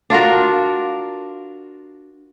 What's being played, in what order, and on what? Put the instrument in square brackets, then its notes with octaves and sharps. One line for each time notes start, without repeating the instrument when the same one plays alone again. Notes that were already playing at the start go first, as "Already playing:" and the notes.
[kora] D4 F4 F#4 A#4